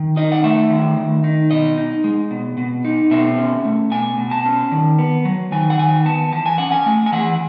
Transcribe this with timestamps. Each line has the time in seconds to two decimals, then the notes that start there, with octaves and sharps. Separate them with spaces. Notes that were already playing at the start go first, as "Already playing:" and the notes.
Already playing: D#3
0.17 D#4 D#5
0.32 F#5
0.44 A3 E5
0.71 D#3
0.97 D#3
1.24 D#4
1.51 B2 D#5
1.78 D#4
2.04 G#3
2.31 B2
2.58 B2
2.85 D#4
3.11 B2 E5
3.38 C#4
3.65 A3
3.91 B2 G#5
4.18 B2
4.31 A5
4.45 C#4
4.72 D#3
4.99 B3
5.25 F#3
5.52 D#3 G#5
5.70 F#5
5.79 D#3 G#5
6.05 B3 A5
6.32 E3 A5
6.46 G#5
6.58 C#4 F#5
6.72 G#5
6.86 A3
7.06 G#5
7.12 E3 F#5